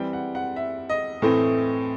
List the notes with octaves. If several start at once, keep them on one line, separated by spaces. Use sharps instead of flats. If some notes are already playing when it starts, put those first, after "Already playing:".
Already playing: E3 G3 C4 G5
F#5
F#5
E5
D#5
A2 E3 A3 C4